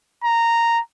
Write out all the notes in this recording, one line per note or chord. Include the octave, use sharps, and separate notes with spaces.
A#5